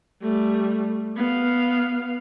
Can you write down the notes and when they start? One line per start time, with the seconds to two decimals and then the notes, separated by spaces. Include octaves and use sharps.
0.23 G3 A3
1.17 B3 F5